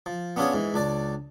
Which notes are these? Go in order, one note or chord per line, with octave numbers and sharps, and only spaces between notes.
F3
B3 C#4 D4 F4 G#4 C#5
G#2 E3
C#2 D4 D5